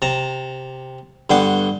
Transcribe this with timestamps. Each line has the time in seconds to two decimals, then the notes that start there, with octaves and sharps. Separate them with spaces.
0.02 C3 A5 A#5
1.30 G2 D3 B3 G5 C6 D6